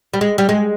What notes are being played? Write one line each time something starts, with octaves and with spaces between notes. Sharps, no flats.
G3
G#3
G3
G#3